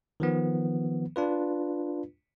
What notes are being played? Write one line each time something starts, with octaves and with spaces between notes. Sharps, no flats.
D#3 F3 B3
D4 F4 B4